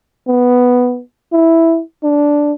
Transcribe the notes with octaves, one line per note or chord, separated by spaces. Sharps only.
B3
E4
D4